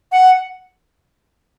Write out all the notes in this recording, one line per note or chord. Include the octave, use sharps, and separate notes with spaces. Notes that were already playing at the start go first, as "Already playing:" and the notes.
F#5